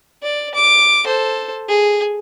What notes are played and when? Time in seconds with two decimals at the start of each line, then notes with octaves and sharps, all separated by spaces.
0.23 D5
0.55 D6
1.05 A4 C5
1.69 G#4